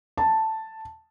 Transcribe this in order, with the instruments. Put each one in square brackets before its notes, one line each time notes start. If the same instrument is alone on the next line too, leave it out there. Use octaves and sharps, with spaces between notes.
[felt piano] A5